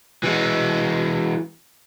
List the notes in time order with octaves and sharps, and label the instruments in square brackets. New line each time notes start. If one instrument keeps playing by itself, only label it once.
[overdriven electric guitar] E3 G#3